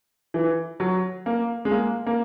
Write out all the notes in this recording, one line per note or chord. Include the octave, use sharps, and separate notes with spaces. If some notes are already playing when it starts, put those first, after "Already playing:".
E3
F#3
A#3
G#3
A#3
A#3